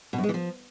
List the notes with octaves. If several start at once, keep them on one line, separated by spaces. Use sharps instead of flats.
B2
F#2
G#3
E3
F3